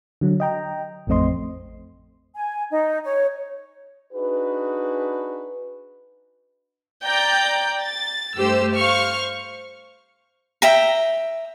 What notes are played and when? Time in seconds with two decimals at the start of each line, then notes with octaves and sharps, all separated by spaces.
0.21 D3 F#3
0.40 D#5 G5 A#5
1.07 A1 F2 A3 C4 D#5 C6
2.35 G#5
2.71 D#4
3.04 C#5
4.13 D4 D#4 F#4 G#4 B4
7.04 D5 G5 A#5 G6
7.81 A6
8.37 G2 A3 G4 C5 E6
8.75 C5 F5 C#6 F6
10.62 E5 G5 A#5